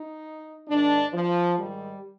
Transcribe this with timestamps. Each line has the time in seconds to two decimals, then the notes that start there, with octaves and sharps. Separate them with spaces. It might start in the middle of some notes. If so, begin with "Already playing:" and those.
Already playing: D#4
0.68 G#2 D#3 D4
1.13 F3
1.59 G#2 D#3 G3